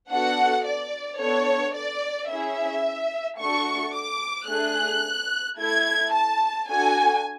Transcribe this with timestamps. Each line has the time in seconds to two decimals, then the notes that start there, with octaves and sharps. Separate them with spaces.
0.10 B3 D4 F#4 A4 F#5
0.65 D5
1.20 B3 D4 A4 C#5
1.75 D5
2.29 C#4 E4 G#4 E5
3.39 A3 D4 F#4 A4 C#6
3.95 D6
4.48 A3 D4 G#4 F#6
5.58 A3 E4 A4 G#6
6.13 A5
6.68 D4 F#4 A4 G#5